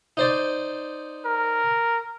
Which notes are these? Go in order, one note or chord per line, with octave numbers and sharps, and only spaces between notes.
D#4 C5 D5
A#4